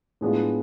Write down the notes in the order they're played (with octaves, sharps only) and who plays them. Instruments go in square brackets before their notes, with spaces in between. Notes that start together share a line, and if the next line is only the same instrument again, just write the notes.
[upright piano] A2 G#3 B3 D4 F4